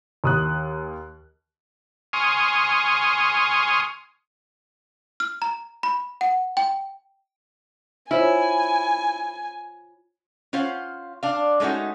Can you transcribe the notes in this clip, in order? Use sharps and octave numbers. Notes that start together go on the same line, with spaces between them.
D#2 D#6 F#6
G#5 C6 C#6 D#6 F6
F6
A#5
B5
F#5
G5
E4 F4 C5 C#5 G#5
C#4 F4 C5 F5 F#5
D4 F5
G#3 A3 C#4 D#4 F#4